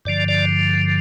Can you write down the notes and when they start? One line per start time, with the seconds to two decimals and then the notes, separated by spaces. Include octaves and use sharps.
0.05 G2 D3 F3 D5
0.28 D5